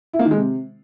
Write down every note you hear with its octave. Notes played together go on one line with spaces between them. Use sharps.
E4
A#3
D#3
G#3
C3